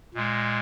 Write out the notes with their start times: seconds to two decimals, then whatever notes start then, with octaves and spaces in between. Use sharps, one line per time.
0.14 A#2 G#3